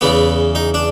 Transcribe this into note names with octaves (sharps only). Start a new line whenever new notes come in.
E2 C#3 E3 B3
D#4
D4